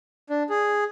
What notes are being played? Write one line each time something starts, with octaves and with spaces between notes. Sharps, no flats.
D4
G#4